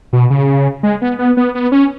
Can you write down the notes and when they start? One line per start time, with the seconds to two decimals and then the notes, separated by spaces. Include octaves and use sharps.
0.13 B2
0.30 C#3
0.83 G#3
1.01 B3
1.19 B3
1.37 B3
1.55 B3
1.72 C#4